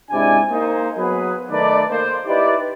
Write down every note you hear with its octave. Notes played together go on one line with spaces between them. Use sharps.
G#2 C3 D4 E4 D5 G#5
A#3 D#4 C5
F#3 B3 G#4 B4
D#3 A3 D#4 A4 B4 D5
A#3 C5
D#4 E4 G4 B4 D5